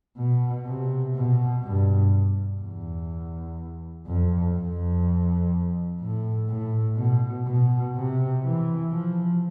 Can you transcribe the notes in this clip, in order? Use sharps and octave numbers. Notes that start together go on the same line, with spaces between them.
B2
C3
B2
G2
E2
F2
F2
A2
A2
B2
B2
C3
E3
F3